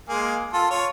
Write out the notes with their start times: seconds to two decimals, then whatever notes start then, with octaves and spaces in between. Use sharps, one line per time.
0.09 G#3 A#3 G#4
0.53 F4 A4
0.70 F4 C#5